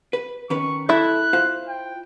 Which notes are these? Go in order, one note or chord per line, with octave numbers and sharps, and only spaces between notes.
B4
D#3 C#4 B4 C#6
E4 A4 E5 F#6
F4 C5 F5
G5